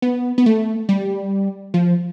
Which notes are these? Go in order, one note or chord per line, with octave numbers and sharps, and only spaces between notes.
B3
B3
A3
G3
F3